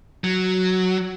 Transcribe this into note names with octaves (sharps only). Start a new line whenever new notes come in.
F#3